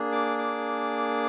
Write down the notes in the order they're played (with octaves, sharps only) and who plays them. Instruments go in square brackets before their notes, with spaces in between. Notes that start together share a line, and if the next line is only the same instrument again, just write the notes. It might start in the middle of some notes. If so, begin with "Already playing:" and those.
Already playing: [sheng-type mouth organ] A#3 D4 G#4
D6
D6